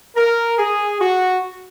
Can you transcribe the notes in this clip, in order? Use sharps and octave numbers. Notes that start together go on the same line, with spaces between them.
A#4
G#4
F#4